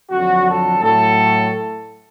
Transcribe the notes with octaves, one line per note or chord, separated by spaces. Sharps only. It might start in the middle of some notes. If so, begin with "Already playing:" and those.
F2 D3 F#3 F#4
A4
A2 F#3 A4